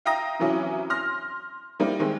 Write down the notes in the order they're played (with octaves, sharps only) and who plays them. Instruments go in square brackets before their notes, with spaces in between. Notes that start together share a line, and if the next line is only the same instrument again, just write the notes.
[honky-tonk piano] E5 F5 G5 A#5 D#6 A#6
C3 E3 F#3 C#4 E4
C6 F6 A#6
G3 A#3 C4 D#4 E4
D#3 G#3 C4